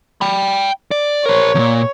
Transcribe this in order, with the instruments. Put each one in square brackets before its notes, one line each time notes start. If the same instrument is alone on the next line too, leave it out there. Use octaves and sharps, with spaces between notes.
[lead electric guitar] G5 B5
D5
[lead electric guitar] A#4 C5 [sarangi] C#5
[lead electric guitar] E2 A#2